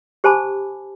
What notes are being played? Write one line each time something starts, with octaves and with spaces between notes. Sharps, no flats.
G4 C5 G#5 A5 B5 D6